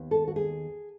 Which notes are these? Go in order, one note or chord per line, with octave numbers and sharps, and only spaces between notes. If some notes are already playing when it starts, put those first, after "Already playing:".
Already playing: D#2 D#3 B3
A4
F#4
G#4